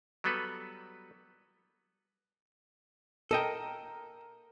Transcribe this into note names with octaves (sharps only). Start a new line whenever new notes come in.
F#3 G3 B3 A4 B4
A4 A#4 D#5 G5